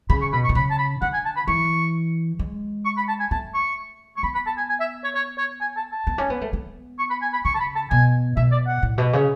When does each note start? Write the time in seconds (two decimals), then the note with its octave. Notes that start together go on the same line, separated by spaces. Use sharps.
0.10 C#3 B5
0.21 C#6
0.32 B2 B5
0.44 C#6
0.49 B2
0.55 C#3 B5
0.70 A5
0.78 B5
1.02 D3 F#5
1.13 G#5
1.25 A5
1.36 B5
1.47 E3 C#6
2.39 G#3
2.85 C#6
2.97 B5
3.08 A5
3.20 G#5
3.31 A3 A5
3.54 C#6
4.17 C#6
4.23 B3 B5
4.34 B5
4.46 A5
4.57 G#5
4.69 G#5
4.80 E5
5.04 C#5
5.15 C#5
5.38 C#5
5.61 G#5
5.77 A5
5.92 A5
6.07 B3
6.18 C#4
6.30 B3
6.41 A3
6.53 B3
6.99 C#6
7.10 B5
7.22 G#5
7.33 B5
7.45 C#3 C#6
7.55 A5
7.60 B5
7.75 A5
7.90 B2 G#5
8.37 B2 E5
8.51 D5
8.67 F#5
8.82 A2
8.98 B2
9.13 C#3